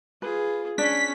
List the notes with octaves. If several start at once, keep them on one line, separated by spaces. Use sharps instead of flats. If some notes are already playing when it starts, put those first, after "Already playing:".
F4 G#4 B4
C#4 D4 B6